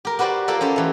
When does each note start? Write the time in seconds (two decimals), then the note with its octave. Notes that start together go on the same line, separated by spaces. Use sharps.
0.05 G4 A#4
0.19 F#4 G4 B4 C5 D5
0.48 A#3 F4 A4 C5 D5
0.61 C#4 G4 C5
0.76 E3 A3